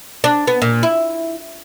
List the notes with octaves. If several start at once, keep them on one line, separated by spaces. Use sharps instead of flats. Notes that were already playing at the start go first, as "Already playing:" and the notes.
D4
B3
A#2
E4